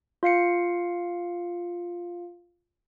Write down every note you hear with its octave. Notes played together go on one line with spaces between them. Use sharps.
F4 F5 C7 C#7